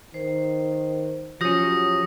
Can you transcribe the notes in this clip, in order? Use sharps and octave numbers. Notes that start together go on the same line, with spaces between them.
D#3 C5
F3 F#3 C#4 G4 D#6 A#6